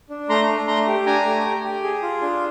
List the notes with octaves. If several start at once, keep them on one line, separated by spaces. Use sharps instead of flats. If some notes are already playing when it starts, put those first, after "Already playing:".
D4
A3 A#5 C6
D4
A3 A#5 C6
G4
D4 G#5 A#5
A3
G4
G4
G#4
F4
D4